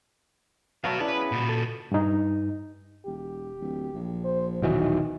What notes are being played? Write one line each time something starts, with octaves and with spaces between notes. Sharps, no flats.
F#3 A3 F#4 B4 F5
C#4 D4 E4 G#4 B4
B3
A#2 F#4
A4
G2 D#4
E1 G4
D1
A#1
C5
D#1 B1 D#3 E3 F#4